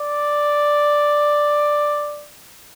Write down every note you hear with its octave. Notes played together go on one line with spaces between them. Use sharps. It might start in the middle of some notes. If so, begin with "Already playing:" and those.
Already playing: D5